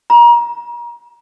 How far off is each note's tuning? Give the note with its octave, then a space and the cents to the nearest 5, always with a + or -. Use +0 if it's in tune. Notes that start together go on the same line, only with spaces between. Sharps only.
A#5 +30